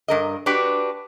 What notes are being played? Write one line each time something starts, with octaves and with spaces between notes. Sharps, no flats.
G2 A#4 D#5
D4 F#4 G4 B4